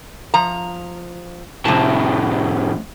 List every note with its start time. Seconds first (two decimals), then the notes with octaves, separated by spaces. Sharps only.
0.34 F3 A#5
1.65 F2 A2 C3 A5